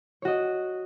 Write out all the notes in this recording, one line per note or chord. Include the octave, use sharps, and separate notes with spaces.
F#4 C#5 D#5